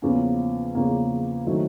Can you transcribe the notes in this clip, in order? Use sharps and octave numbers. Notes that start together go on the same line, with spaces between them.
E2 C#3 F3 A#3 C#4
E2 C#3 F3 A#3 C#4
D#3 F#3 A3 C4 E4